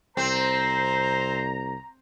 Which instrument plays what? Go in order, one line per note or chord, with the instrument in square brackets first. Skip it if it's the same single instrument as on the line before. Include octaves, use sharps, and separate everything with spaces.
[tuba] C2 [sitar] C4 [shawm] C5 [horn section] A#5